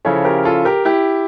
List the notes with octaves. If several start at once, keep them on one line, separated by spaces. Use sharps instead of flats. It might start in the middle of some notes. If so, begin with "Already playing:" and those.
C#3 F3 C#4 E4 A4 C#5
G4 A#4
F4 A4
G4 A#4
E4 G4